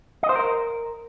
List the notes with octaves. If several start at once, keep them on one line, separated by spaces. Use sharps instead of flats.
D#5
C5
A#4